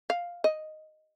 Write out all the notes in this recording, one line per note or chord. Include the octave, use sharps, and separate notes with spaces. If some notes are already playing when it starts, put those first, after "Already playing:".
F5
D#5